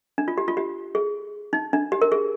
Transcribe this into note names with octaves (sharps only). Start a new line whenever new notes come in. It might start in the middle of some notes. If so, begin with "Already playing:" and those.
D4
F4
G4
F4
G4
G#4
D#4
D4
G4
A#4
G#4